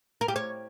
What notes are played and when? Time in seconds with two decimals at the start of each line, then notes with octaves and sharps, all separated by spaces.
0.21 A#4
0.28 G4
0.36 C#5